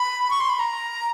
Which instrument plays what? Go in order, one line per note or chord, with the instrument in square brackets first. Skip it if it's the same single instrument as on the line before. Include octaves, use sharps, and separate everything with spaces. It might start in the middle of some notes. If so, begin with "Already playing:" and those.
Already playing: [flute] B5
C#6
C6
B5
A#5